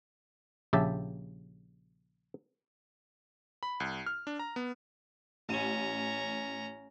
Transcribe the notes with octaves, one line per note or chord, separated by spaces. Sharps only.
A#1 C#3 G4 E5 A5
B5
C2
F6
D4
A#5
B3
A1 C#4 A#5 D#7